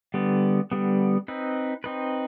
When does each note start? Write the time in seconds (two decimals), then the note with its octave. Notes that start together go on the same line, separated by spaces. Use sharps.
0.14 D3 G3 B3
0.72 D3 G3 B3
1.28 C4 D#4 B4
1.84 C4 D#4 B4